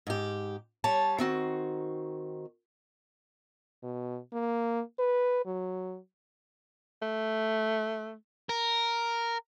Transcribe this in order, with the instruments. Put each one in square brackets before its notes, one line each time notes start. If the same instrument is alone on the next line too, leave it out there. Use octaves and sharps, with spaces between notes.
[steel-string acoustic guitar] G#2 G4
G3 C#5 A5
D#3 C4 F#4
[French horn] B2
A#3
B4
F#3
[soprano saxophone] A3
[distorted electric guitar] A#4